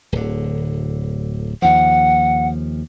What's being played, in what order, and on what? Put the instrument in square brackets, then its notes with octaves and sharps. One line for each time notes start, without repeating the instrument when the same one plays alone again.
[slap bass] D1 D3
[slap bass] D#2 F3 [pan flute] F#5